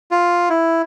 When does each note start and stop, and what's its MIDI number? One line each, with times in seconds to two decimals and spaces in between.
0.11 0.49 65
0.50 0.82 64